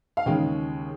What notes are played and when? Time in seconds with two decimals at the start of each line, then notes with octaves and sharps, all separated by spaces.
0.17 F5
0.26 D#2 C#3 G#3 G5